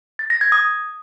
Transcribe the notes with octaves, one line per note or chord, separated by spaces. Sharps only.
A6
A#6
G#6
D#6